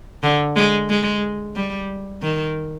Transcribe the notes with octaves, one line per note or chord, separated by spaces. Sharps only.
D3
G#3
G#3
G3
D#3